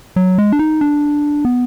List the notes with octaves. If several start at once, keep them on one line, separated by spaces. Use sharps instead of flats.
F#3
G#3
D4
D#4
D4
B3